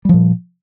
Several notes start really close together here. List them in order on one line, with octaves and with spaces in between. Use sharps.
G3 F3 A#2